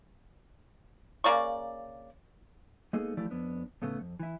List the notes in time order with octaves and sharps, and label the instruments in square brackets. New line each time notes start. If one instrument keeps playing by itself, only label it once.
[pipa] C#3 A#3 D5 C#6
[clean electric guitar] G#3 A#3 B3 D#4 G#4 A4
E3 F3 A3 E4 G4 D5
F2 B3 D4
A2 C#3 A3 B3
F2
E3 E4